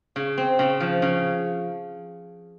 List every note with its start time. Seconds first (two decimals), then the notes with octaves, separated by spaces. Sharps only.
0.16 C#3
0.38 C4
0.59 C#3
0.80 F3
1.02 C#3